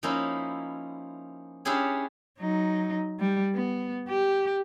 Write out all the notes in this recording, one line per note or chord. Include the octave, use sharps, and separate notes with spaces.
F3 A#3 C#4 D#4 E4
C#4 D4 E4 G4 G#4 C#5
F#3 D#4
G3
B3
G4